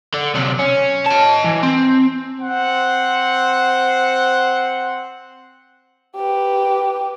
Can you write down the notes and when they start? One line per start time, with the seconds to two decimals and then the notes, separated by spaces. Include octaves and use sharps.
0.14 D3
0.35 C3 F#3
0.59 C#4
1.06 D#5 A5
1.44 E3
1.63 C4
2.39 C4 C5 F#5
6.15 G4 B4